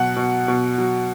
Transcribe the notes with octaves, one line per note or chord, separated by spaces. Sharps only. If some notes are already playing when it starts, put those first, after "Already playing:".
Already playing: B2 F#3 F#5
B2
B2
F#3